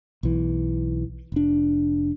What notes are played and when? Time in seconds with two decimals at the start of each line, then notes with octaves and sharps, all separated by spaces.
0.23 B1 E3
1.32 F1 D4